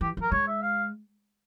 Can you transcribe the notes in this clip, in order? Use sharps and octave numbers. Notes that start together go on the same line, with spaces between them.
E3 G4
F3
A#4
G#3 C#5
E5
F5